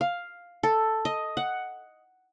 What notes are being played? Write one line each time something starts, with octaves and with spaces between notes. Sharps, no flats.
F5
A4
D#5
F#5